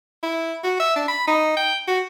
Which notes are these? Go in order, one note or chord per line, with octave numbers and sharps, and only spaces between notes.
E4
F#4
E5
D4
B5
D#4
G5
F#4